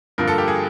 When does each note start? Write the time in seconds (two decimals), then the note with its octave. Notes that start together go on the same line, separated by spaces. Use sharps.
0.18 G2 D3 F3 A#3 A#4
0.28 A4
0.38 G4
0.48 G#4